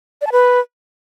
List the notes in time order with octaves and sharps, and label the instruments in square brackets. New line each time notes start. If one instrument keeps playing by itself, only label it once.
[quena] D5
A5
B4